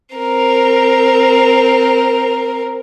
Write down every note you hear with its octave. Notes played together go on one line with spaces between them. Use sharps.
C4 A#4